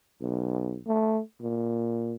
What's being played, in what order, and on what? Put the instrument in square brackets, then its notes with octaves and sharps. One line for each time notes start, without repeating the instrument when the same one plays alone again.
[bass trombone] B1
A3
A#2